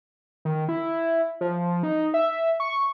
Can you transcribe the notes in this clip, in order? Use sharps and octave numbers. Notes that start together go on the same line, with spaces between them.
D#3
E4
F3
D#4
E5
C#6